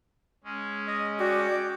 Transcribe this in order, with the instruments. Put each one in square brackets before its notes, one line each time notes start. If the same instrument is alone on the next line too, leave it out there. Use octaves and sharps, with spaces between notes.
[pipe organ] G#3 C#4
[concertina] D#5
[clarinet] F#4 [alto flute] D5 [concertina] G5 D6